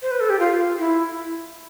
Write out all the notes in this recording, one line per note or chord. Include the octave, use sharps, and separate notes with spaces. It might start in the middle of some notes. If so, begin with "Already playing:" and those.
C5
B4
A4
G4
F4
E4